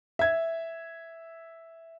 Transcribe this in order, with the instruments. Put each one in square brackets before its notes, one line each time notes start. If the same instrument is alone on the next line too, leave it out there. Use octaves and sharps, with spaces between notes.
[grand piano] E5 G#6